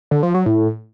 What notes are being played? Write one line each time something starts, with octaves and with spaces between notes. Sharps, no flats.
D3
F3
F#3
A2